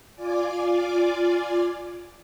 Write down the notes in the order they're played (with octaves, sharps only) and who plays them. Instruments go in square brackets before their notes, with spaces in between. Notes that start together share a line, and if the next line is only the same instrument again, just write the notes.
[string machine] F4 D5 G#5 D6